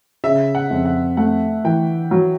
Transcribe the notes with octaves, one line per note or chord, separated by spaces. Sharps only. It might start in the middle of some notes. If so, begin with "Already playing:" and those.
C#3 E5
F#5
F2
F#5
A3 F#5
E3 G5
F#3